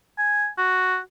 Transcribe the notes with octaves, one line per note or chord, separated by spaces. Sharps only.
G#5
F#4